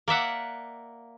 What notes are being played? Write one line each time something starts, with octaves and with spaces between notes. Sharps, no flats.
A#3 D5 E5 F#5